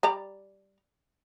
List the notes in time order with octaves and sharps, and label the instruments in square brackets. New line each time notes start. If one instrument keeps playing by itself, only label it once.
[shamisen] G3 D5 A#5